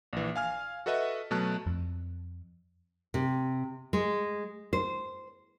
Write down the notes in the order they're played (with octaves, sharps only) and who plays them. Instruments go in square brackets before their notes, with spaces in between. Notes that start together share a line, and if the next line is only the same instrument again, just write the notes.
[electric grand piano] A#1 E3
F5 G#5 F6
F#4 A4 B4 D#5 E5 F#5
B2 F#3 A3 A5 F#6
[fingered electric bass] F2
[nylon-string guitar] C3
G#3
C5